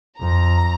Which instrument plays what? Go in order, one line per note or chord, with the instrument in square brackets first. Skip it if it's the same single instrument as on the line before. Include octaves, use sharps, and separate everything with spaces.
[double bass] F2 [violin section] A#5